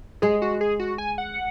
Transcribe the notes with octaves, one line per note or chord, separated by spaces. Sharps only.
G#3 G#4
F#4
G#4
F#4
G#5
F#5